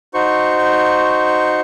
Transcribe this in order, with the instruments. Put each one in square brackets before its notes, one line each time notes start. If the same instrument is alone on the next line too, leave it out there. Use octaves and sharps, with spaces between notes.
[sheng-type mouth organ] D#4 F#4 C5 C#6